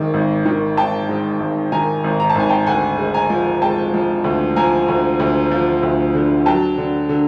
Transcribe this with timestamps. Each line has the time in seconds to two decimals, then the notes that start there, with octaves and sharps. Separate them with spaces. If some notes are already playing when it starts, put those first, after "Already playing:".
Already playing: G#1 D#3 G#3
0.14 G#1
0.46 D#3
0.77 G#1 G5 A5
1.09 G#2
1.40 G#1
1.72 D#3 G#5 A#5
2.04 G#1
2.20 A#5
2.30 A5
2.35 G#1 G#5
2.49 G5 A5
2.67 D2 F#5 G#5
2.99 G#3
3.14 G#5 A#5
3.30 F3
3.61 G#3 G5 A5
3.94 F3
4.24 D2
4.56 F3 G#5 A#5
4.88 D2
5.20 D2
5.51 F3
5.83 D2
6.15 D3
6.46 F#3 G5 A5
6.78 D3
7.09 D3